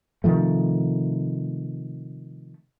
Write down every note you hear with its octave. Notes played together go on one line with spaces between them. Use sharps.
C3 D#3 F3 A3